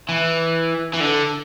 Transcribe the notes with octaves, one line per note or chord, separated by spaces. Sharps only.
E3
E3
D3